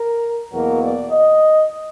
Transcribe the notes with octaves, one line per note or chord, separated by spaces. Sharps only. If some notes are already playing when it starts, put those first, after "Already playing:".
Already playing: A#4
E2 B2 F#3 A#3 A#4
D5
D#5